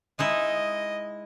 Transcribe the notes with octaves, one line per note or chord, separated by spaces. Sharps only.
G#3 D#4 E4 D#5